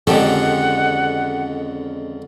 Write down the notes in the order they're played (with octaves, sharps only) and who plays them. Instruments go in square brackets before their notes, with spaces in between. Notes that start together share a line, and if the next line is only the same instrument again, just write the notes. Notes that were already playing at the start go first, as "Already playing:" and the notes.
[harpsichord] F2 D3 D#3 [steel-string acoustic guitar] G#3 C#4 [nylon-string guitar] G4 A4 [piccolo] F#5